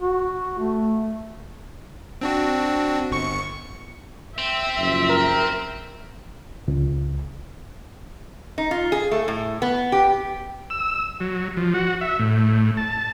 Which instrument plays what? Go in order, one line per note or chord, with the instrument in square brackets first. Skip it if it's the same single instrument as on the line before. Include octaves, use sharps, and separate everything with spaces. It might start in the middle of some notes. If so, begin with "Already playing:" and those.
[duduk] F#4
A3
[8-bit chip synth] C4 D4 F#4
G1 C#6 C#7
[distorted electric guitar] C4 [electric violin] E5
[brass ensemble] F#1 F#2 F3
[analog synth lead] A#4
[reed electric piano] C#2
[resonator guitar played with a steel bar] D#4
F4
G#4
A3
A2
B3
G4
[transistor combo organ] E6
F#3
F3
F#4
E5
A2
A5